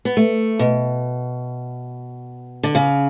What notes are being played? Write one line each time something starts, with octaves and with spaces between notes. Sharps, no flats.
B3
A3
B2
D3
C#3